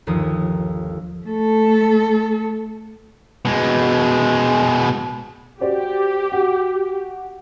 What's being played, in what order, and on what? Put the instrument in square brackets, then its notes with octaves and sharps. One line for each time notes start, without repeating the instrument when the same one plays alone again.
[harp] G1 D#2 F3 D#6
[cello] A3 A4
[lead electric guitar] B2 G#3
[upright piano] F#4 C5 D5 [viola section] G4
[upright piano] F#4